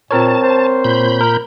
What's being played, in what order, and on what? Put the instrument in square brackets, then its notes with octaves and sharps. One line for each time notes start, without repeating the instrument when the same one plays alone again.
[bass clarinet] A#2 [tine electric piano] C4 A#4 C#5 [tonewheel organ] A5
[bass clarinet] C5
[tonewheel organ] A#2 B5 G6
[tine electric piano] A#4